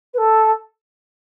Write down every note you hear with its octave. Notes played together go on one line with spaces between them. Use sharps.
B4
A4